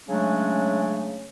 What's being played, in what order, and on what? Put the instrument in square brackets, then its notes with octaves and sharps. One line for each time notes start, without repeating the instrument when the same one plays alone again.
[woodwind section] C#3 F#3 G#3 A3 C#4 D4